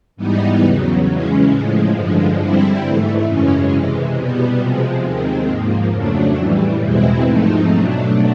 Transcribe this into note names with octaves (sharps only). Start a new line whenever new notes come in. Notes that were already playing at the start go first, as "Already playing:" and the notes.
G#2 E3 G3 B3 D#4
E2 C#3 F#3
C#3 E3 G#3 C#4
A2 F3 G#3
G2 D3 F3 G#3
D3 G3 C4 E4
G#2 E3 A3
F#2 C#3 E3 G#3 C#4
C3 E3 G#3
B2 G3 B3
C3 F3 G#3
D#2 D#3 G#3 C4
G#2 F3 A#3
F2 C#3 F#3 A3 D4
A2 E3 G3
E2 B2 G#3 C4 E4
G#2 F3 A3 C4 D#4
B2 F#3 A3 D4